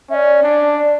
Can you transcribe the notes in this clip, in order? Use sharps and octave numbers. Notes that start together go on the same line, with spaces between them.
C#4 D5 E5
D4
D5